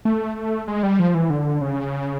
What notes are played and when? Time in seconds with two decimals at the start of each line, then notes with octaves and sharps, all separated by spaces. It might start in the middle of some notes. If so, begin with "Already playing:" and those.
0.05 A3
0.68 G#3
0.83 G3
1.00 F3
1.14 E3
1.30 D3
1.61 C#3